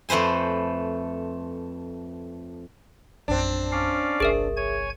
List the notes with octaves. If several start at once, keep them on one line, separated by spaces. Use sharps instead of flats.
F2 A3 B4 C5 G#5
A#1 F#2 C4 D4
C#4 D5 F5
G1 C2 G#4 A#4 E5
C#5 G#5 G#6